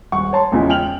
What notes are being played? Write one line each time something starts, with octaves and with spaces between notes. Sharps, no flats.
D#1 F#5 C#6
C#5 A5 C6
A1 E2 C#3 F3 G#3
G5 F6 F7 F#7